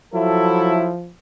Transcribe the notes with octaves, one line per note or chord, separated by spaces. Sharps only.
F3 F#3 E4 A4